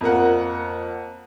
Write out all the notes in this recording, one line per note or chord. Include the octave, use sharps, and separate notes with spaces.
F2 A#3 A#4 F#5